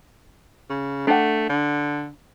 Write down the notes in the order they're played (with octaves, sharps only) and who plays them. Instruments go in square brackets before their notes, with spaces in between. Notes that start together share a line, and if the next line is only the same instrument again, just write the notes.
[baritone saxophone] C#3
[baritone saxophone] A3 [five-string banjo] D4 F#5
[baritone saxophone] D3